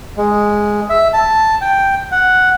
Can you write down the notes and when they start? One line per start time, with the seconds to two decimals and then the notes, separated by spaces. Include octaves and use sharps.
0.17 G#3
0.90 E5
1.13 A5
1.61 G5
2.11 F#5